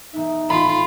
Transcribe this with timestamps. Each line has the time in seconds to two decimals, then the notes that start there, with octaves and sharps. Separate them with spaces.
0.14 E1 B3 D#4 E5
0.50 A1 F4 B5